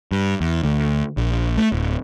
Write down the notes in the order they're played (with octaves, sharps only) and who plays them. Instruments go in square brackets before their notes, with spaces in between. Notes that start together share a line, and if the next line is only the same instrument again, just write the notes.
[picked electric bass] G2
E2
D2
A#1
A3
D1